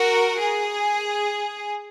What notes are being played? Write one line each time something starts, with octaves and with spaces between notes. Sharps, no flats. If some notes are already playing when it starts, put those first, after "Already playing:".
Already playing: F#4 A#4
G#4